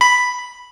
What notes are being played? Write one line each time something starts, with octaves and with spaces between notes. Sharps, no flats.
B5